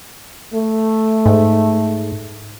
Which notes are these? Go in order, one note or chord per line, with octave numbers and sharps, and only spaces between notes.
A3
G#2